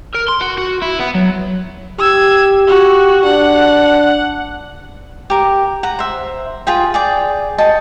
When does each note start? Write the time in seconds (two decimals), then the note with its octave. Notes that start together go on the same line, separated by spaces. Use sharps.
0.14 A#4
0.28 C6
0.41 F#4
0.58 F#4
0.82 E4
1.00 B3
1.15 F#3
1.99 G4 E6 G#6
2.68 F#4 G4
3.25 D4 F#5
5.30 G4 A#4
5.83 F#5 A#5
5.99 C5 E5
6.67 F4 G#4 G5
6.94 G#4 D5 G5
7.58 F#4 D#5 G5 A5